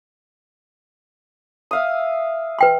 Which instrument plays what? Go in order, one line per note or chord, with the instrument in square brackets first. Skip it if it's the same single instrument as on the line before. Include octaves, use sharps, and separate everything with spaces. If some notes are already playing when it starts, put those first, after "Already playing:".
[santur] E5 F5 D#6
[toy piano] B4 G5 C6